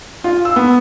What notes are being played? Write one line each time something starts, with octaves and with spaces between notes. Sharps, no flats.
F4
E6
B3